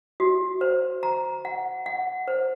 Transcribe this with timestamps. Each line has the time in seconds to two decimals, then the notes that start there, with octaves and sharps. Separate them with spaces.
0.20 F#4
0.61 C5
1.03 A#5
1.45 F#5
1.86 F#5
2.28 C5